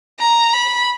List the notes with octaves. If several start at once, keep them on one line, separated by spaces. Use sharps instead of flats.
A#5
B5